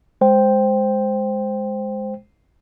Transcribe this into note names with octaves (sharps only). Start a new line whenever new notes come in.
G#3 C5 G5